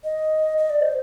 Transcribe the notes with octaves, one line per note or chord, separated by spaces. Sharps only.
D#5
D#5
D5
C5